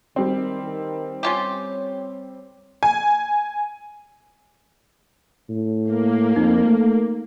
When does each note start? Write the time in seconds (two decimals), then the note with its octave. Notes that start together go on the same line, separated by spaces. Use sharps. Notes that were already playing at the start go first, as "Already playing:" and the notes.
0.16 D#3 G3 C4
0.63 D#3
1.23 C#4 F4 G4 C#5
2.83 G#5
5.49 A2
5.92 A#3
6.36 F2 D#4
6.65 A3